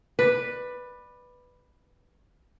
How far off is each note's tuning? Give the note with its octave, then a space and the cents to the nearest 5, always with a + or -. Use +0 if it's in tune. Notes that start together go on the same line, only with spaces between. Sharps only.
B4 +0 D5 +20